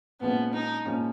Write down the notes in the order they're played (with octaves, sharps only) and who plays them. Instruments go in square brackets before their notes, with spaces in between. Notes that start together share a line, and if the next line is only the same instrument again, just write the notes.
[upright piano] A#2 F3 G#3 C#4 [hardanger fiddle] B3
[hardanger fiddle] D#4
[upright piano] A#2 F3 G#3 C#4